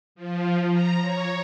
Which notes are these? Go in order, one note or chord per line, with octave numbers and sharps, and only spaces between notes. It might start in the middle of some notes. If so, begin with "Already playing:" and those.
F3
A#5
C#5